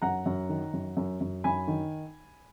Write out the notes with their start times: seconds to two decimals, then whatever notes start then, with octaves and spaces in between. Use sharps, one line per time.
0.02 F#2 F#5 A#5
0.26 F#2
0.49 D#3
0.74 F#2
0.97 F#2
1.21 F#2
1.44 F#2 G#5 B5
1.68 D#3